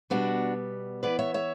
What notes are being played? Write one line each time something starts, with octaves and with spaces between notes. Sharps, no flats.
B2 G3 B3 D4 F#4
E3 B3 B4 D5
C#5 E5
C#5 E5